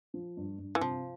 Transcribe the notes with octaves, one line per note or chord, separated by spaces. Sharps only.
F3
G2
G2
E3
C3 F3